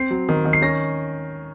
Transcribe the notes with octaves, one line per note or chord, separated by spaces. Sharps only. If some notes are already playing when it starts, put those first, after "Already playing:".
Already playing: C4 C7
F#3
D#3
D#3
C7
C#4 A#6